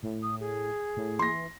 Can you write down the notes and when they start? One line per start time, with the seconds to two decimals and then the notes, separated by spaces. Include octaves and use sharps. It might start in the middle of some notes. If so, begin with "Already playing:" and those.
0.03 A2
0.23 D#6
0.40 G#4
0.97 A2
1.19 E3 C6 A#6